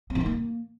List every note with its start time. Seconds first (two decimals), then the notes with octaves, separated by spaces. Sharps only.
0.10 C4
0.15 E3
0.20 D#3
0.26 A#3